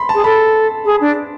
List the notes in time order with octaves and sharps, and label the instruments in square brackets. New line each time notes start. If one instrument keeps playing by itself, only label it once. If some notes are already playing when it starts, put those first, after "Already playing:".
Already playing: [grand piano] B5 C6
A5
[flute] G#4
[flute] A4 [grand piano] B5
[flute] G#4
D4